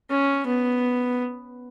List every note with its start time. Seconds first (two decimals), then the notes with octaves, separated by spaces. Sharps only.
0.10 C#4
0.46 B3